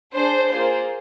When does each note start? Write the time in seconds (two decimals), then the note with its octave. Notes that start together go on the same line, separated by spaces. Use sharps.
0.14 D4 G#4 C5
0.50 A#3 F4 G#4 C5